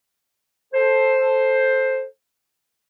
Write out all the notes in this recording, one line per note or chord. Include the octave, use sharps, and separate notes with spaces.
A4 C5